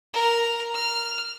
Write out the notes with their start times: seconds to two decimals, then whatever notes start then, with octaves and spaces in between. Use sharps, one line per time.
0.14 A#4
0.74 F6